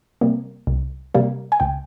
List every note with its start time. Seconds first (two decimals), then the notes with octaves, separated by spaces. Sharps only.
0.21 C3 G3 A#3
0.67 C2
1.14 C3 G3 A#3
1.52 G#5
1.60 C#2 G5